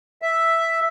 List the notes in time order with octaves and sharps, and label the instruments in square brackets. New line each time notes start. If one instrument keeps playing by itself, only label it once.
[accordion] E5